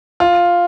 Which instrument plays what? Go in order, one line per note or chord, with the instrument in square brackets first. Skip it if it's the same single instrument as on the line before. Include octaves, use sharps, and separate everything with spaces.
[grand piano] F4